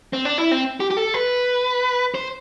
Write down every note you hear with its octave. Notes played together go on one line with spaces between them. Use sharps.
C4
D4
E4
C4
G4
G4
A4
B4
C5